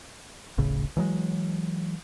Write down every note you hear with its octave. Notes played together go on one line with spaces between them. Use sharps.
D1 G#1 A2 C#3
E3 F#3 G#3